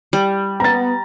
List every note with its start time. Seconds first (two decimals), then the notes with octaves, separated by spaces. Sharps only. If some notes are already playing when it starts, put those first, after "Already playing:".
0.13 G3
0.60 B3 A#5 A6